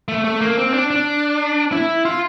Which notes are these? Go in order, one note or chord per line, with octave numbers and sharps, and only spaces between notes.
A3
A3
A#3
C4
D4
D4
E4
F4